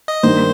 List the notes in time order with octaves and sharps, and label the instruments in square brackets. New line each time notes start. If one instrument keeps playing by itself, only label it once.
[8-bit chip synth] D#5
[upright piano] G2 D#3 A#3 D4 [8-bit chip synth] C5